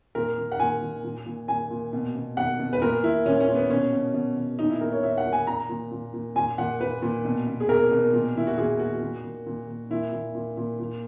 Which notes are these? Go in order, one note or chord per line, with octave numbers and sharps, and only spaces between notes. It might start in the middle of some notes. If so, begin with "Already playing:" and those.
A#2 A#4
A#2
F#5
A#2 G#5
A#2
A#2
A#2
A#2 G#5
A#2
B2
B2
B2 F#5
B2
B4
A#2 A#4
A#2 E4
A#2 C#4
C#4
A#2
B3
B2 C#4
B2
B2
B2
A#2 D#4
E4
A#2 A#4
C#5
A#2 E5
F#5
A#2
G#5
A#2 A#5
A#2
A#2
A#2
A#2 G#5
A#2 F#5
A#2 B4
A#2
B2
B2
G#4
B2 A#4
B2
A#2
A#2 E4
F#4
A#2 G#4
A#2 F#4
A#2
A#2
A#2
A#2
A#2 E4
A#2
A#2
A#2
A#2